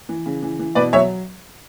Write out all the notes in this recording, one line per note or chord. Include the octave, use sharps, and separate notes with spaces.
E3
C#3
E3
E3
B2 B4 D5
F#3 C#5 E5